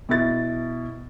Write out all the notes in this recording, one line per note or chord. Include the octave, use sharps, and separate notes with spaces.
B2 E4 A6